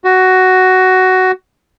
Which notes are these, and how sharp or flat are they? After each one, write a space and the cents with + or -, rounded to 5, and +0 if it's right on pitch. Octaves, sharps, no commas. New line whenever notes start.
F#4 +10